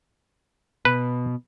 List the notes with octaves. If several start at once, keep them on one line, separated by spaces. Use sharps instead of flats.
B2 B4